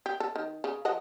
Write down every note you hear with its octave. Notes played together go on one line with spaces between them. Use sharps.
G4
A4
D#3
C#3
F3 D#5 F#5